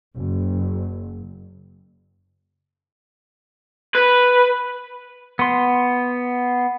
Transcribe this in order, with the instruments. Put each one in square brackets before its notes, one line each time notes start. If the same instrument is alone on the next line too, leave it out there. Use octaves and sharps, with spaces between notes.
[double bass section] F#1
[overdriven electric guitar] B4
[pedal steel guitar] B3 C6